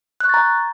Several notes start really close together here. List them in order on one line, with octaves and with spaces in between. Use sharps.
F#6 C#6 A6 A#5 G6